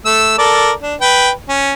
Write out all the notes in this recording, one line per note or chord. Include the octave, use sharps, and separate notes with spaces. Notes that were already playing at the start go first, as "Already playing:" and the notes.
A3 E6
A4 A#4 D5
D4
B4 G5
C#4